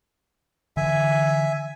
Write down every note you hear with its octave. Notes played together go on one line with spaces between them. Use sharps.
D3 E3 E5 G#5